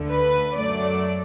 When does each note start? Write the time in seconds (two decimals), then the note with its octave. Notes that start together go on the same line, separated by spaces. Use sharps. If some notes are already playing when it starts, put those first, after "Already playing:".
Already playing: D2 D3 A3
0.10 B4
0.56 F#2 F#3 A3 D5